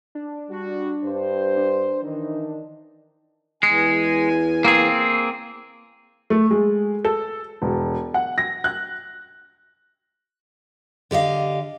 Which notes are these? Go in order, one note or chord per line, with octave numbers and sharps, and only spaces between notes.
D4
G3 F#4
G2 C5
D4
D#3 E3 D#4
E2 G#3 G#5
A#3 C4 G#4
A3
G#3
A4
E1
F#5
A#6
F#6
D3 G4 D#5 F5